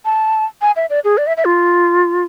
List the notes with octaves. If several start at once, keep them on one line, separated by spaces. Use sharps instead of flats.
A5
G#5
E5
D5
G#4
D5
E5
E5
F4